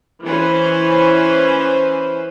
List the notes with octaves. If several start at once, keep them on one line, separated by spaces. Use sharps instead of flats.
E3 C#4 B4 C5